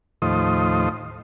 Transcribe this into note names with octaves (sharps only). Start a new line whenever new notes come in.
D#2 A2 F3 C5 D#5